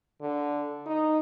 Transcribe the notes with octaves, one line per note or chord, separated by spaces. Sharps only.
D3
D#4